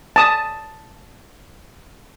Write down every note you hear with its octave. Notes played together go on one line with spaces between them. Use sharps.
A5 D#6